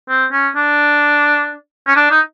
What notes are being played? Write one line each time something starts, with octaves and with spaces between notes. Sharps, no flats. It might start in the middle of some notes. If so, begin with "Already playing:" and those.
C4
C#4
D4
C#4
D4
D#4